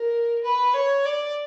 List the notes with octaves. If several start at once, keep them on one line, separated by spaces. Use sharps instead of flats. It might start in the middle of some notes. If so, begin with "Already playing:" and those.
Already playing: A#4
B4
C#5
D5